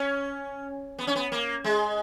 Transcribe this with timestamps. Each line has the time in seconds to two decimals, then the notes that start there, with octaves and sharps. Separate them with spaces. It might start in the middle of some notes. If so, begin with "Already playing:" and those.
Already playing: C#4
0.99 B3
1.07 C#4
1.16 B3
1.32 A#3
1.64 G#3